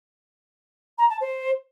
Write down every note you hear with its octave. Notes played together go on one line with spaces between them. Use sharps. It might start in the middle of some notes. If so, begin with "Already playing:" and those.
A#5
A5
C5